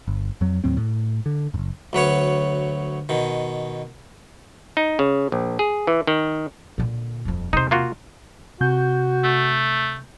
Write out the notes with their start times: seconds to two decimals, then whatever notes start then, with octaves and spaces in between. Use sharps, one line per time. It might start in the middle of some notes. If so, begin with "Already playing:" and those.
0.08 G1
0.41 F2 F#3
0.64 D#2 A2 F#3 C4
0.77 A2
1.26 D3
1.54 F#1 F#2
1.93 D2 F#3 B4 C#5
3.09 B2 D#3
4.77 D#4
4.99 C#3
5.32 A#1
5.59 G#4
5.87 E3
6.07 D#3
6.78 A#2 D3
7.25 D#1 F2
7.53 E2 C3 D#4 C5
7.71 A#3 F4 F#4
8.61 C3 F#4 G6
9.24 A3